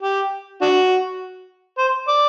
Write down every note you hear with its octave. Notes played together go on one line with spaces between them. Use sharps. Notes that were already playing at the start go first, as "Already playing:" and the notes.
G4
D4 F#4
C5
D5